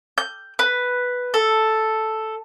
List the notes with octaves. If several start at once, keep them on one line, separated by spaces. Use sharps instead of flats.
G6
B4
A4